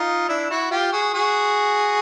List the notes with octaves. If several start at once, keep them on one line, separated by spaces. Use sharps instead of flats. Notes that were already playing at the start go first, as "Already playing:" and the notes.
Already playing: D#4 F4
D4 E4
E4 F#4
F4 G4
F#4 G#4
F#4 G#4